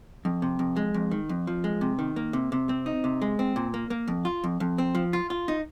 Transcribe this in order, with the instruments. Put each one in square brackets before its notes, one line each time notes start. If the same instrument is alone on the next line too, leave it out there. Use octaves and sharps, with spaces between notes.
[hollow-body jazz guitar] F2
C3
F2
G#3
F2
D#3
F2
F3
G#3
C3
D#3
A#3
C3
C3
C4
D#4
C3
G#3
C4
A#2
A#3
A#3
F2
F4
F2
F2
C4
F3
F4
F4
D#4